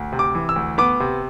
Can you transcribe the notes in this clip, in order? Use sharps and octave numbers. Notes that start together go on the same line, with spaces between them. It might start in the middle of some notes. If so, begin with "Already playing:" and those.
Already playing: D2
C3
D6
E3
E6
D2
B3 D6
C3